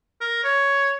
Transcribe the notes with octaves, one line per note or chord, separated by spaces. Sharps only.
A#4
C#5